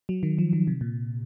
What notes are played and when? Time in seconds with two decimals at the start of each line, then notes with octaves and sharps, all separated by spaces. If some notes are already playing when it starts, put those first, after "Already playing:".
0.09 F#3
0.23 D#3
0.38 F3
0.53 D#3
0.67 C3
0.81 A#2